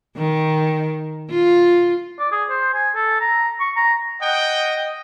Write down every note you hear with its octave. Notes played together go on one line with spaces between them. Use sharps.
D#3
F4
D5
G#4
C5
G#5
A4
A#5
C#6
A#5
D#5 F#5 G5